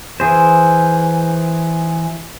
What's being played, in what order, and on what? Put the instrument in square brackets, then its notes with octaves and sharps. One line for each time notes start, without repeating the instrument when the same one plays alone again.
[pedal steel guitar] E3 G#4 C5